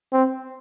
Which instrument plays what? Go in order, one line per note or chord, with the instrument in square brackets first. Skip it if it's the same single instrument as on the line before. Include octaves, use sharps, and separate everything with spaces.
[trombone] C4